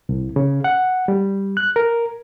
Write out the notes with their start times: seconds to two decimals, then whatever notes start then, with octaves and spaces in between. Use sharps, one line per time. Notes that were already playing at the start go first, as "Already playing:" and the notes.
0.09 C2
0.36 C#3
0.64 F#5
1.08 G3
1.57 F#6
1.76 A#4